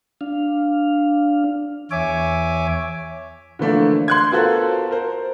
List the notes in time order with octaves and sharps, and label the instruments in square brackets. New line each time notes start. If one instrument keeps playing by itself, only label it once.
[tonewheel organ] D4 F5
[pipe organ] E2 C#5 E5 G#5 D6
[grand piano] D3 E3 F3 A3 A#3 D4
C6 F#6 G#6
B3 F4 F#4 A4 A#4 C5
A#4 C5